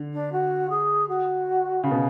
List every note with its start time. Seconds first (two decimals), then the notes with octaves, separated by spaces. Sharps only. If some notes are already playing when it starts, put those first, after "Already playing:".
Already playing: D3
0.12 D4
0.32 F#4
0.69 G#4
1.08 F#4
1.83 C#3
1.91 B2